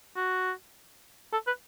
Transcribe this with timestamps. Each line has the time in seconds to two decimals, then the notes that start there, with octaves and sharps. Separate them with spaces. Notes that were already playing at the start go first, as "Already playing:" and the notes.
0.16 F#4
1.33 A4
1.47 B4